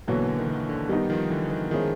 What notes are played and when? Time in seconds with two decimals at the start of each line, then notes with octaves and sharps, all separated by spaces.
0.08 B2 D3 E3 F#3 A#3
0.28 D3
0.38 D#3
0.49 D#3
0.69 D3
0.89 D#3 G3 B3 D#4
1.10 D#3 F3
1.30 D3 E3
1.51 D#3
1.71 D#3 F3 G#3 C#4 E4 G#4